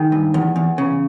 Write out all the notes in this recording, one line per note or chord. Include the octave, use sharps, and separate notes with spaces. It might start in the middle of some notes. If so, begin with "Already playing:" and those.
Already playing: D#3 G#4
G2
E2
E2
C#3